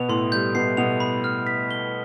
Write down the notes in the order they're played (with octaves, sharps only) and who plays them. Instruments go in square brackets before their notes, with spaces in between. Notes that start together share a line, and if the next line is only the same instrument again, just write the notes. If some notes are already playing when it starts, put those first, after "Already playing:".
Already playing: [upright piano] B2 B3 [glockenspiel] F7
[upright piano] A2 A3 [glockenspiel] C6
[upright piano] G3 [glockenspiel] G6
[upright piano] B2 B3 [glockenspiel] C7
[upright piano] B2 B3 [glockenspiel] F7
[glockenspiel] B5
F6
B6
G7